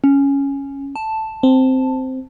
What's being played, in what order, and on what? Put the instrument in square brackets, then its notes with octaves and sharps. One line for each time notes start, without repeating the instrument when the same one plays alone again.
[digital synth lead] C#4
A5
[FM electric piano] C4